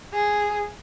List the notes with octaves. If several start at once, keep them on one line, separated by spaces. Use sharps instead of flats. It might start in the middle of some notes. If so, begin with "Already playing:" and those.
G#4